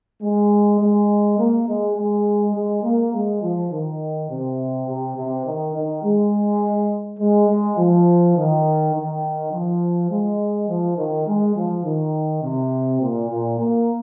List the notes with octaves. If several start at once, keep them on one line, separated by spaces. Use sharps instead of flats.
G#3
G#3
A#3
G#3
G#3
G#3
A#3
G#3
F3
D#3
C3
C3
C3
D#3
D#3
G#3
G#3
G#3
F3
D#3
D#3
F3
G#3
F3
D#3
G#3
F3
D#3
C3
A#2
A#2
A#3